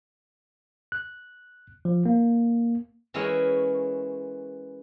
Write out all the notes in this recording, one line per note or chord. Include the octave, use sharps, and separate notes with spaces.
F#6
F3
A#3
E3 G#3 C#4 E4 A#4 C#5